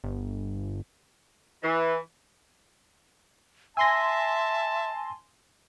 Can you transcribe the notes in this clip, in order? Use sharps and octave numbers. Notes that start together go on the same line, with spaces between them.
G1
E3
E5 G#5 A5 C6 E6 A#6